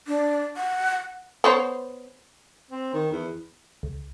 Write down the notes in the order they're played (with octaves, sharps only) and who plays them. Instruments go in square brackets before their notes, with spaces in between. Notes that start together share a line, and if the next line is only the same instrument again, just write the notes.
[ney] D4
F#5
[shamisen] B3 C5 C#5
[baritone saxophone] C4
D#3
E2
[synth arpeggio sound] C#2